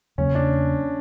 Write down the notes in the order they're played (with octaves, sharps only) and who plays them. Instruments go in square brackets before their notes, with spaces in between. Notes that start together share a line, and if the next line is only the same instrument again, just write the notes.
[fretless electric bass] E2 C#3 F#3 A#3 [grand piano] C#4
[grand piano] D4